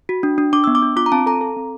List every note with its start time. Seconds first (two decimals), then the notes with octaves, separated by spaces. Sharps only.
0.09 F#4
0.23 D4
0.38 D4
0.53 D4 D6
0.64 E6
0.67 B3
0.75 D6
0.82 D4
0.96 F4 D6
1.06 A#5
1.12 C4 A5
1.26 A4 A#5
1.41 A4
1.56 C4